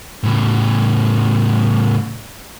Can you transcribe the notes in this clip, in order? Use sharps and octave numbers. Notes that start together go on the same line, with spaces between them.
A2 C#3